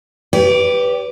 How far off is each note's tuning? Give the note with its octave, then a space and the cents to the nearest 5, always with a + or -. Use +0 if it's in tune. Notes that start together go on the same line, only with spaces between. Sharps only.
G4 +0 B4 +0 D5 -45